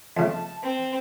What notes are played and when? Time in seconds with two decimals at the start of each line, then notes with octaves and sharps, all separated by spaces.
0.17 F2 C#3 A3 A5
0.62 C4 C5